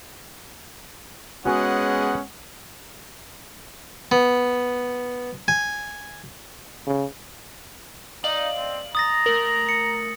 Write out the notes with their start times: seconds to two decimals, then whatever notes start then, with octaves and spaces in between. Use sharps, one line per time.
1.46 G#3 B3 C#4 F#4 G#4 C#5 F#5
4.12 B3
5.48 G#5
6.87 C#3
8.24 D#4 D5 D#5 F5 F#7
8.56 C4
8.95 A#5 D#6 A6 A#6
9.26 A3 A#4 F#7
9.69 C#7